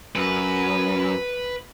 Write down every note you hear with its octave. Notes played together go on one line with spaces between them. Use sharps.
F#2 B4